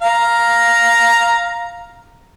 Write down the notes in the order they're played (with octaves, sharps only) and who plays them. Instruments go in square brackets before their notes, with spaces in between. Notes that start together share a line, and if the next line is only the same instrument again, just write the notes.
[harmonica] F5 A#5